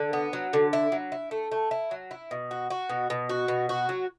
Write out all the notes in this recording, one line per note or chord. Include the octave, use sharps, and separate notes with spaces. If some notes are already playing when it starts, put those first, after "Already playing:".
Already playing: D3
B3
F#3
D3
E4
F#3
E4
A3
A3
E4
F#3
E4
B2
F#4
F#4
B2
B2
F#4
B2
F#4
F#3